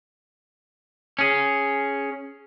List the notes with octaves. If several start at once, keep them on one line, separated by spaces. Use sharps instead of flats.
C#4 G#4